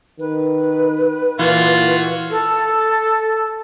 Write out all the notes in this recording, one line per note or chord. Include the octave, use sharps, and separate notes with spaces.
D#3 B4
A#2 E3 F4 F#4
A4